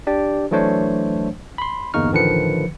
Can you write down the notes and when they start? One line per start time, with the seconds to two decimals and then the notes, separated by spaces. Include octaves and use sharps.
0.07 D4 G4 D5
0.51 E3 F#3 A3 D4 C5 C#5
1.58 B5 C6
1.94 G1 E2 A#3 D#4 C#6 F6
2.12 A1 D3 D#3 F3 B4 C#7